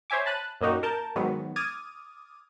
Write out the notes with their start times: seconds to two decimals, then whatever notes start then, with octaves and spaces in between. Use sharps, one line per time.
0.10 C5 C#5 E5 G#5 D6
0.26 A5 B5 F#6 D#7
0.61 F#2 A#2 A#3 D#4 F#4 G4
0.83 A#4 A5 G6
1.16 G#2 D#3 F#3 B3
1.56 D6 D#6 F6 G#6 A6 D#7